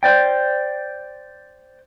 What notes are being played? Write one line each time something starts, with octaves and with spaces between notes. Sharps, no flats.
C5 D5 G5